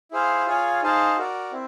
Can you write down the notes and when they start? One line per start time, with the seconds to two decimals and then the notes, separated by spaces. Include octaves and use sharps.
0.11 E4 G#4 C5 F5
0.46 F4 G#4 C#5 F5 G#5
0.82 D#4 G#4 C5 F5 A5
1.17 F#4 A#4 D5
1.52 C4 E4